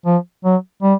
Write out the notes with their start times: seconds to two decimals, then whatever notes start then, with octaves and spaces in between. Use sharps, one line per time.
0.05 F3
0.44 F#3
0.82 G3